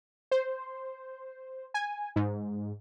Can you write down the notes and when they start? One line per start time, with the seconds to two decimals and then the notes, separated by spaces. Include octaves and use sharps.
0.31 C5
1.74 G#5
2.16 G#2